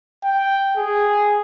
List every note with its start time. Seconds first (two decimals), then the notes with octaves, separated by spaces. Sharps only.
0.24 G5
0.77 G#4